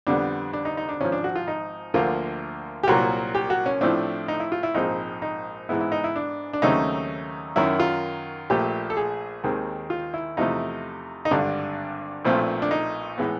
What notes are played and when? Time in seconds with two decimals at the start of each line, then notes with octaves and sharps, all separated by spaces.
0.07 F2 D3 G3 B3 D4
0.53 D4
0.65 D#4
0.77 D#4
0.89 D4
1.00 G#1 G#2 F3 C#4
1.12 D4
1.24 F#4
1.35 F4
1.48 D#4
1.94 D2 D3 F3 A#3 F4
2.83 G4
2.87 C2 A#2 F#3 A#3 F#4
3.35 G4
3.50 F#4
3.66 C#4
3.81 A2 F3 A3 C4 D4
4.28 D#4
4.40 E4
4.52 F4
4.63 E4
4.75 A#1 G#2 F3 G#3 C4 D#4
5.22 D#4
5.69 G#2 E3 G#3 B3 E4
5.81 E4
5.92 D#4
6.04 E4
6.16 D4
6.53 D4
6.62 D#2 C#3 F#3 A3 C4 D#4
7.56 F#2 D#3 F#3 E4
7.80 F4
8.50 A#1 A#2 F3 A3 G4
8.90 A4
8.97 G#4
9.44 D#2 D#3 G#3 C4
9.90 F4
10.14 E4
10.37 E2 C3 F3 A3 D#4
11.25 D#4
11.31 G#1 G2 D3 D4
12.25 B1 A#2 F3 A3 C4
12.62 D4
12.71 D#4
13.18 A2 E3 G#3 B3